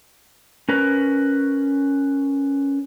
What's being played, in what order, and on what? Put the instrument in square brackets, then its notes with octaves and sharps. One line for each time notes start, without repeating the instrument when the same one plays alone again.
[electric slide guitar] C#4 A#4 B4